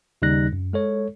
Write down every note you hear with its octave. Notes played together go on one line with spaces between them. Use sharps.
D#2 C#3 G3 D#4 F#6 A#6
F#2
G#3 A4 C#5